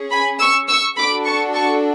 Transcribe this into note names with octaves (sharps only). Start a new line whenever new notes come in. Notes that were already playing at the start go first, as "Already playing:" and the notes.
Already playing: C#4 G#4
G#5 B5
C#6 E6
C#6 E6
D4 F#4 A4 B5 D6
A5 C#6
A5 C#6